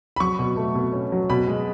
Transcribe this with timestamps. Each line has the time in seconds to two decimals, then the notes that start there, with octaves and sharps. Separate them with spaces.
0.16 B5
0.20 F#3 C#6
0.39 B2
0.56 A3
0.75 B2
0.93 C#4
1.12 F#3
1.30 B2 B5
1.47 G#3